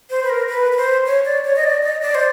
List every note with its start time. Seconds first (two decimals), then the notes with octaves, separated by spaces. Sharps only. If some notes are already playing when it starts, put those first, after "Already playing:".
0.10 C5
0.23 B4
0.30 A#4
0.49 B4
0.72 B4
0.77 C5
1.06 C#5
1.25 D5
1.45 C#5
1.56 D#5
1.64 D5
1.83 D#5
2.02 D5
2.15 C5